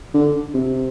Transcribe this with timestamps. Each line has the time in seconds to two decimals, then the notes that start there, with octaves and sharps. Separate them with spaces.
0.14 D3
0.54 C3